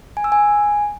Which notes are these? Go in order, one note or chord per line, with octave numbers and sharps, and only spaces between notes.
G#5
E6
G#5